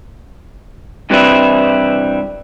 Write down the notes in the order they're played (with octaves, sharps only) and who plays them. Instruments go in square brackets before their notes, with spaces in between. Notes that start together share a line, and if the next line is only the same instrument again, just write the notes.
[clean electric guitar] G2 C3 E3 G3 C4 E4